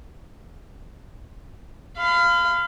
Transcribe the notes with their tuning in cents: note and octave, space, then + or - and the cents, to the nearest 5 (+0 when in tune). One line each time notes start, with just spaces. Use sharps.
F5 -10 B5 +40